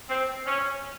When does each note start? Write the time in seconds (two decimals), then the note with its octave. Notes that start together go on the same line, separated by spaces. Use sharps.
0.09 C4
0.45 C#4